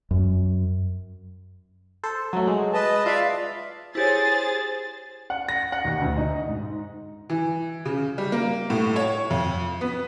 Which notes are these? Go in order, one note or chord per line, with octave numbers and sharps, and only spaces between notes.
F#2
A4 C5
F#3 A3
G#3
B4 D#5 A5
F4 D5 E5 F5
E4 G4 G#4 C5 C#5 A6
F#5
A#6
F#5
D#2
D2
D#4
G#2
E3
C#3
G3
A#3
A2
C#5
F2
B3